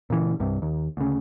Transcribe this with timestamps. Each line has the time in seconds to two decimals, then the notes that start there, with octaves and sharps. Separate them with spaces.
0.10 A#2 C#3 E3
0.40 C2 G2 C3
0.62 D#2
0.97 D2 C#3